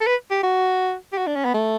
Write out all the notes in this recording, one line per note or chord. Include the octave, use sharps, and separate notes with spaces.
A4
B4
G4
F#4
G4
F#4
D4
C#4
B3
A3